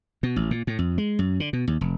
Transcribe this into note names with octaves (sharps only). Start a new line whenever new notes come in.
B2
A1
A#2
A2
F2
G#3
F#2
D3
B2
D#2
F1